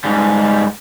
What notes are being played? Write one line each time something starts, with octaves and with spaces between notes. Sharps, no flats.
G#2 G3